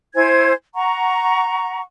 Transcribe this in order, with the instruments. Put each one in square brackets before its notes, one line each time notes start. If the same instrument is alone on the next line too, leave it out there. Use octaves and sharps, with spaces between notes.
[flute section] E4 C5 G#5 G#6
F#5 A#5 C#6